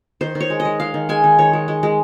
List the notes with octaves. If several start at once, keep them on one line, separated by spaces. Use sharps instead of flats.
D#3 C5
D#3
C#5
G#3
D#5
G#3
G#3 F5
D#3
G#3 G#5
D#3
D#3 C#5
G#3
G#3
G#3